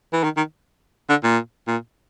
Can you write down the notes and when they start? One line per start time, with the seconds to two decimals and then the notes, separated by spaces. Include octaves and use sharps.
0.13 E3
0.24 D#3
0.37 D#3
1.09 D3
1.24 A#2
1.68 A#2